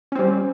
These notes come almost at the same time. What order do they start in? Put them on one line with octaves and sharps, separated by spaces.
C#4 C4 G3